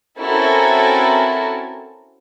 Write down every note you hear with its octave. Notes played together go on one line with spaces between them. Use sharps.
C4 C#4 E4 F#4 A4 A#4